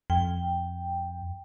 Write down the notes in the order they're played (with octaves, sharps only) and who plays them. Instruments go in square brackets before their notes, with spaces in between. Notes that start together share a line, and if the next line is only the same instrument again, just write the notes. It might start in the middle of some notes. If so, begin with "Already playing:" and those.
[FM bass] F2 [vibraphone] G5